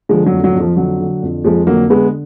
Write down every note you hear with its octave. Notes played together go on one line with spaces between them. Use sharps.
D3 F3 G#3
F#3
F2
F#3
F2
F3
D3 F#3
D3
F2
F2 F3 G#3
D3 F#3 A#3
D3 G#3 B3